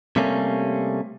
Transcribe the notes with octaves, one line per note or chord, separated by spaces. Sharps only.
C3 G3 A3 A#3 C#4